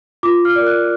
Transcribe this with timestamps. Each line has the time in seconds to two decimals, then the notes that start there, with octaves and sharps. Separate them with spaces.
0.23 F4 D6
0.45 F6
0.56 A#4 D5
0.67 F#6